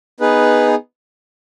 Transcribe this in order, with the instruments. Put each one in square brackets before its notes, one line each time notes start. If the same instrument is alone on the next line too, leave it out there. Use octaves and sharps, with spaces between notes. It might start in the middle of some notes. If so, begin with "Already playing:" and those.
[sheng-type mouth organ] B3 D#4 G#4 B4